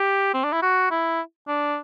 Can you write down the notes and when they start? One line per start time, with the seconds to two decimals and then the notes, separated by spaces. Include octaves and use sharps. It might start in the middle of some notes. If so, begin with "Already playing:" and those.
Already playing: G4
0.34 C4
0.44 D4
0.52 E4
0.62 F#4
0.91 E4
1.48 D4